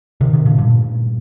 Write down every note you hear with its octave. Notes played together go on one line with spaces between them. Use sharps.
C3 D#3
C3 D#3
A#2 D3
G2 A#2